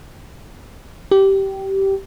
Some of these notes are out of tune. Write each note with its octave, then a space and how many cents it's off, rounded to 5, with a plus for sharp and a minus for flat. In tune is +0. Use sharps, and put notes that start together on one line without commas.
G4 -15